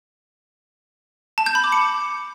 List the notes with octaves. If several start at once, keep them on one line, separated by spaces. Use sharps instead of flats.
A5
G6
B5
D6
C#7